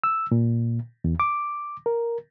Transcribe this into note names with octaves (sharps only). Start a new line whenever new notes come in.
E6
A#2
E2
D6
A#4